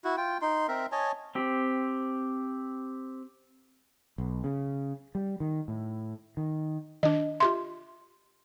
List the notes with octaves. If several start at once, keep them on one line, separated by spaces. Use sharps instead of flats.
E4 F#4
F4 G5
D#4 C6
C4 A#4 E5
C#5 D#5 G#5 A5
C4 G4
B1
C#3
G3
D#3
A2
D#3
D#3 D4 D#5
F4 G4 E5 C6